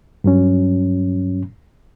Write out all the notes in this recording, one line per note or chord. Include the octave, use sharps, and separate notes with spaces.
G2 F#3 C#4